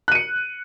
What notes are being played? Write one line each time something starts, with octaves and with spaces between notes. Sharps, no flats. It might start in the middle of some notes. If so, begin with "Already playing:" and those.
F#6 C#7 D#7